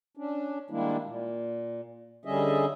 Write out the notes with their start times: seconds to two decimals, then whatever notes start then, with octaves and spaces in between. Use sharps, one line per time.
0.17 C#4 D4
0.70 D#3 G3 G#3 A#3 D4 E4
1.04 A#2
2.25 D3 G3 C#4 G#4 D#5 E5